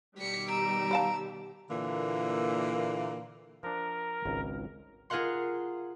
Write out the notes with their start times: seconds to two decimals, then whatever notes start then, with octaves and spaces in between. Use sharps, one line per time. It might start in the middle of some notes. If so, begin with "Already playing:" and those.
0.18 B2 D#3 G3 B6 C#7
0.50 A#5 E6 D7
0.91 B4 F5 A5
1.70 A#2 D3 E3 A#3
3.63 F3 D4 A#4
4.25 G#1 C#2
5.10 F4 G#4 A#4 F5 F#5 C6